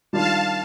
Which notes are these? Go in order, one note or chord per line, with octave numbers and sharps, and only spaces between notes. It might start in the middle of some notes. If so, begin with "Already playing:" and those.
D#3 G3 D4 F4 F5 A5